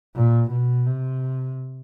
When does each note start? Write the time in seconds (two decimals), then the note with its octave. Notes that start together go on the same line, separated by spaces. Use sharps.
0.15 A#2
0.51 B2
0.86 C3